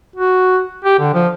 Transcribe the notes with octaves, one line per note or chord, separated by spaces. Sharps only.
F#4
G4
D3
F3